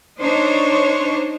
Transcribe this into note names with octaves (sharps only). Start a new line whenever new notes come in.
D4 D#4 C5 C#5